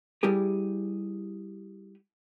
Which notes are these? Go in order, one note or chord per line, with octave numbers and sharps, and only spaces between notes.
G3 E4 G4 G#4